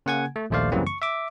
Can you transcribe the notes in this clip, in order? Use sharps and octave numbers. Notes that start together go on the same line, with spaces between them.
C#3 A#3 F#5 G#5 G#6
A3
A#1 D#2 A3 C5 D5 F5
F#2 C#3 E3 G3 A#3 C4
C#6
E5 D6